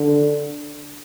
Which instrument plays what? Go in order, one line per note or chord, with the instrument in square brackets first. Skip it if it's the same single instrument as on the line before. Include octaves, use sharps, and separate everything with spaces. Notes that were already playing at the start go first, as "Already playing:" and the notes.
Already playing: [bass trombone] D3